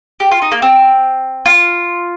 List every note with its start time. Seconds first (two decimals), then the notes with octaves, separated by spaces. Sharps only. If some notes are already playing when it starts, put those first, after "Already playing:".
0.20 G4
0.31 F4
0.42 D#4
0.52 A#3
0.62 C4
1.46 F4